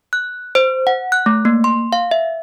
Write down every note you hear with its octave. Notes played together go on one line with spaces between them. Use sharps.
F#6
C5
F#5
F#6
A3
A#3
C6
F5
E5